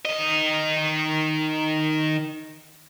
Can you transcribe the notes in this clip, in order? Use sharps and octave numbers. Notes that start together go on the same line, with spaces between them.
D#3 D#5